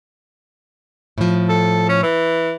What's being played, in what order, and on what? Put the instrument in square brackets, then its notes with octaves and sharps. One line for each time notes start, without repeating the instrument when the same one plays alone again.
[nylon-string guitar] A2 F3
[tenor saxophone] A4
C#4
E3